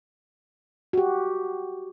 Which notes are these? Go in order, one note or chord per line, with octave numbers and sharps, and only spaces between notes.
F#4 G4